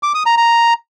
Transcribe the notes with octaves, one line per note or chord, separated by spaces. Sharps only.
D6
D#6
A#5
A#5